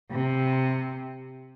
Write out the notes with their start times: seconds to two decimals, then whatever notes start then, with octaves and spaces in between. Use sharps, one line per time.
0.11 C3